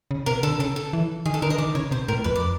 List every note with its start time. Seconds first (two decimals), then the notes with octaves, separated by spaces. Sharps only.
0.11 C#3
0.26 C3 A#4
0.43 D3 A4
0.59 C#3 A4
0.76 A4
0.93 E3
1.26 D#3 G#4
1.34 A4
1.42 D3 A#4
1.50 D#5
1.58 D#3 D5
1.75 C#3 C#5
1.91 C3 C5
2.08 A2 A#4
2.24 F2 B4
2.36 D5